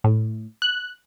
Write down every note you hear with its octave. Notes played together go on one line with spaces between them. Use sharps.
A2
F#6